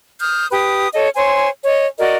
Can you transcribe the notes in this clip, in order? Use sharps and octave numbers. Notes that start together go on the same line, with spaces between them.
D#6 F6 G6
G4 B4 D#6
A4 C#5 D#5
C5 C#5 G#5 C6
C#5 D#5
F#4 A#4 D5 D#5